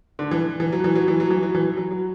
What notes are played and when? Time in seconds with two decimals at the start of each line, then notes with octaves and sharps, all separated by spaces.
0.19 D3
0.31 E3
0.60 E3
0.72 F#3
0.84 E3
0.95 F#3
1.08 E3
1.20 F#3
1.30 E3
1.43 F#3
1.55 E3
1.77 F#3
1.91 F#3